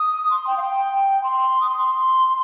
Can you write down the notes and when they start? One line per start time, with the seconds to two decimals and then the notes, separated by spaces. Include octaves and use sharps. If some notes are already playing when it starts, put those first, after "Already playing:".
Already playing: D#6
0.30 C6
0.46 G5
0.57 F5
0.62 G5
1.23 C6
1.60 D#6
1.69 C6